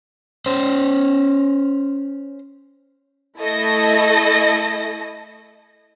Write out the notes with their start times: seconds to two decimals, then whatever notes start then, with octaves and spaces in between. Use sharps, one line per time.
0.46 C#4 C5
3.38 A3 E4 A4 D#5 A#6